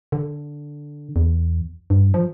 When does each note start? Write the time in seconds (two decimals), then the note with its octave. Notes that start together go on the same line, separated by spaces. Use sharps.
0.12 D3
1.16 E2
1.90 G2
2.14 F3